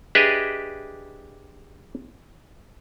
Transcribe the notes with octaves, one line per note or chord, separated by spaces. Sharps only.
D4 G4 G#4 B4 D#5 E5